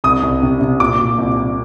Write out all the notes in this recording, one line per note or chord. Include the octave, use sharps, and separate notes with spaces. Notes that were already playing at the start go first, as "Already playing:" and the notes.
C2 D#6
C2
C3
C3
A#2 D6
A#2
C2
C2